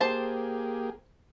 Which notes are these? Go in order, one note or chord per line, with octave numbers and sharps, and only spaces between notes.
A#3 G4 G#4 C5 A5